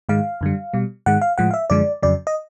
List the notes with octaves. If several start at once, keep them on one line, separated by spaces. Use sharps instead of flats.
G#2 D#3 G#3 F5
F#2 D3 G3
B2 G3
G#2 D#3 G#3 F#5
F5
A2 F3 G#3 F#5
F5
E5
F#2 D3 F3 G#3 D5
F2 C#3 F#3 D5
D#5